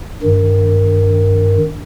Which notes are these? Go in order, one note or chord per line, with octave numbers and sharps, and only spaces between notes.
G2 D#3